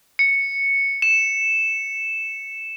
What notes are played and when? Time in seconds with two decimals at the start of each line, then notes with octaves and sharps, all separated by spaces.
0.19 C#7
1.02 E7